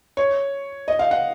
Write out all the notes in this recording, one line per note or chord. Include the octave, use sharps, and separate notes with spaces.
C#5
D#5
F5
F#5